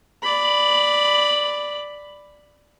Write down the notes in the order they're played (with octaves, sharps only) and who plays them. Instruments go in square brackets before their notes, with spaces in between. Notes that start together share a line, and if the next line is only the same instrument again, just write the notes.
[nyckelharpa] D5 B5